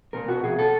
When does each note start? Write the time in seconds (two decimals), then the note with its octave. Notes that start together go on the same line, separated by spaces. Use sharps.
0.13 B2 A#4
0.28 B2 F#4
0.43 B2 G#4
0.58 B2 A4